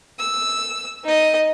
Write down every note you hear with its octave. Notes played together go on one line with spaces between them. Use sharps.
E6
D#4 D#5